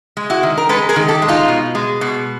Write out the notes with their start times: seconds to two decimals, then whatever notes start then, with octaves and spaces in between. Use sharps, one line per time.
0.17 G#3
0.30 E4 F#4
0.43 D#3
0.57 A#4
0.69 G#3 A4 B4
0.89 G#4 A#4
0.96 D#3
1.08 G4 A4
1.22 G#3
1.28 D#4 F4
1.48 B2
1.75 G#3
2.01 B2